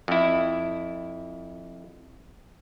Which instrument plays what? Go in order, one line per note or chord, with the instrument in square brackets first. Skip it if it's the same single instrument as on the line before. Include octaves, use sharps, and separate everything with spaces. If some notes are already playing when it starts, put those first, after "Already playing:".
[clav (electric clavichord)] F2 E4